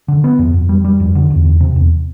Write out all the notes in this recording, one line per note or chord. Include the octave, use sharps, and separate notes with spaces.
D3
B3
F2
F2
G3
G3
F2
D3
E2
E2
C3
E2